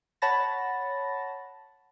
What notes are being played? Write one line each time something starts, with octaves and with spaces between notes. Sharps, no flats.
C#5 F#5 A5 B5 A6 A#6